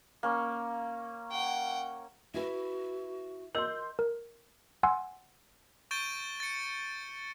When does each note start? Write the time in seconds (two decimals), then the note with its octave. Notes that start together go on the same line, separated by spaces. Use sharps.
0.23 A#3 C#4
1.31 F#5 G5
2.34 E4 F#4 B4 E5
3.55 A#4 D#5 C6 E6 G6
3.99 A#4
4.83 F#5 G#5 C6 E6
5.91 C#6 G6 A6 D7 D#7 G7
6.40 A6 C#7